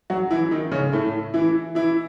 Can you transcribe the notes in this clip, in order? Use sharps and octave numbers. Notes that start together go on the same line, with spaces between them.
F#3 F#4
E3 E4
D#3 D#4
C#3 C#4
A2 A3
E3 E4
E3 E4